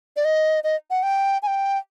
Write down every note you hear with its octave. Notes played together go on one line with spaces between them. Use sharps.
D5
D#5
D#5
F#5
G5
G#5
G5